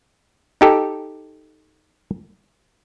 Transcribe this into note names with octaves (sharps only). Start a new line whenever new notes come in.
D#4 G4 A4